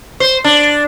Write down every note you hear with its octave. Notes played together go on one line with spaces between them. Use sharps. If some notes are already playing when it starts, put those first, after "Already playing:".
C5
D4